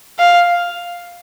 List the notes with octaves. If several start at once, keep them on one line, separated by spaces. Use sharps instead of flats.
F5